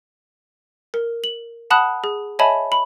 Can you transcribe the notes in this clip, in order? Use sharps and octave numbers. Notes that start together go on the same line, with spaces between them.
A#4
F#7
F#5 A5 B5 D#6 F#6
G#4
C#5 D#5 E5 G#5 A5 B5
B5